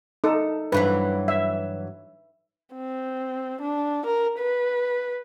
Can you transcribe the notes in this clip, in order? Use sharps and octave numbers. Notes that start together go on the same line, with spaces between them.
D#4 A4
G2 E3 F#3 B4
E5
C4
D4
A#4
B4